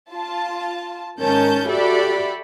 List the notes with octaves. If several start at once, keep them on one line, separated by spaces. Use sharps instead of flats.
F4 A5
G#2 D#3 C#4 A#4 A5 G6
F#4 G4 A4 D5 E5 B5